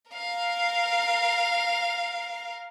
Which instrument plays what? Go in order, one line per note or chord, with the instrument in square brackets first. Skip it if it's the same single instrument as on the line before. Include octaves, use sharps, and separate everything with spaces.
[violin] A#4 F5